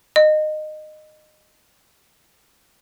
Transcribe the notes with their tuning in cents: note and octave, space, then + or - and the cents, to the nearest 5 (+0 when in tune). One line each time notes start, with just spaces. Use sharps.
D#5 -20